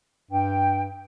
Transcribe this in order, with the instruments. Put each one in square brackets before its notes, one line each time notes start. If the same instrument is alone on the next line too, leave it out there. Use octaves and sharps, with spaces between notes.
[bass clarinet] G2 [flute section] G5